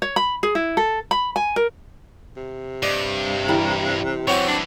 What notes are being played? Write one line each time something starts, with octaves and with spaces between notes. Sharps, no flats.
C#5
B5
G#4
E4
A4
B5
G#5
A#4
C3
G2 D5 D#5
E3 G3 A#4
F#2 E3 C4 F#4 C5 C#5
D4